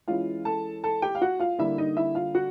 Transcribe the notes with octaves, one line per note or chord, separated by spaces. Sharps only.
E3 G#3 C#4 E4 F4 F5
A4 A5
A4 A5
G4 G5
F5
F#4 F#5
F4 F5
D3 G3 A#3 E4 E5
D#4 D#5
E4 E5
F4 F5
F#4 F#5